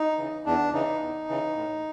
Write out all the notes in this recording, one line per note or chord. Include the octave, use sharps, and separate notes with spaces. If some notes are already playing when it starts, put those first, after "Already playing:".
Already playing: D#4
C#3 E3
E2 D4
C#3 E3 D#4
E2
C#3 E3
A2